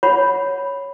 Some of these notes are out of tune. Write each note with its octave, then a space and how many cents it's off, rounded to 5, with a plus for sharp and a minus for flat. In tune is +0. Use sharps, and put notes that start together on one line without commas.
C#5 +0 F#5 -10 B5 +0